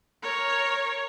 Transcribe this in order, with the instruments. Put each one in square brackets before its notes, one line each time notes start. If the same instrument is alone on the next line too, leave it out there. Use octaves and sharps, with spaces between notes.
[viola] A#4 C#5